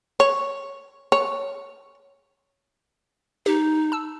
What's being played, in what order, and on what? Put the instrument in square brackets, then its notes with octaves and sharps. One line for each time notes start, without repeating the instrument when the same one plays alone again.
[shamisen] C#5
C#5
[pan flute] D#4 [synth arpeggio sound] G4
[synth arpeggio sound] A5 E6